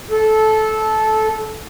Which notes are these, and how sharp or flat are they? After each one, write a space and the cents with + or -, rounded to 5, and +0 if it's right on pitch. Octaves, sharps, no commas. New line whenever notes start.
A4 -15